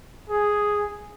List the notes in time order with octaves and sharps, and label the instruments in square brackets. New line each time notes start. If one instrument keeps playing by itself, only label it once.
[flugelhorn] G#4